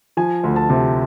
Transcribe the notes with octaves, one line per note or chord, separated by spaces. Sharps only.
F3 G#5
D2
A5
C3